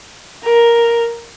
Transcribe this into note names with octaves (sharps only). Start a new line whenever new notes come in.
A#4